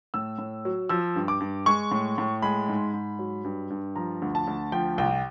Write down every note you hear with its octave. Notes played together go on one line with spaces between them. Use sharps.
A2 E6
A2
F#3
F3 E6
G2
D6
G2
G#3 C#6
A2
A2
G#3 B5
G#2
G#2
F#3
G2
G2
F3 A#5
D2
A5
D2
F3 G5
C2 G5